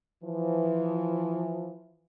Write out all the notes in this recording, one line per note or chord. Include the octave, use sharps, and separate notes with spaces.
E3 F3